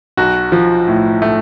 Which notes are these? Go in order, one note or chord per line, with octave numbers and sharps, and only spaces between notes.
B1 F#4
F3
A2
A3